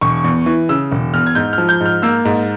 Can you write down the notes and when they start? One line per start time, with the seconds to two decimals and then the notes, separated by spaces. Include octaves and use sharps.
0.01 E1 C#6
0.24 E2
0.46 E3
0.69 C#3 E6
0.92 E1
1.14 E2 F6
1.27 G#6
1.35 G#2 G6
1.53 F6
1.58 F3
1.69 G6
1.80 G#2
1.86 F6
2.02 A#3 E6
2.25 G#2